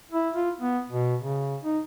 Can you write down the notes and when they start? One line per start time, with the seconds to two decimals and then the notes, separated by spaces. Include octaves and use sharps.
0.12 E4
0.35 F4
0.61 B3
0.90 B2
1.21 C#3
1.63 D#4